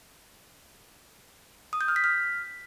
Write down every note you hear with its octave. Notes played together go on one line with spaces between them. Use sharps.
D#6
G6
F6
B6
F6